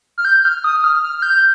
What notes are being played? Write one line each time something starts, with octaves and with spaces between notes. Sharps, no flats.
F6
G6
F6
D#6
F6
F6
F6
G6